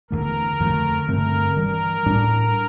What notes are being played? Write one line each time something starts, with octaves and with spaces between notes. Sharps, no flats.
E2 D3 A3 A#4
F2 D3 F3 A3
G2 D3 A3 C4 A#4
G2 E3 G3 A#4
A2 G3 D4